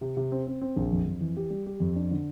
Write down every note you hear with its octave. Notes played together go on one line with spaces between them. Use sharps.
C3
C3
C4
C4
C4
A#1
F2
F2
E3
G4
G3
G4
F2
D4
D3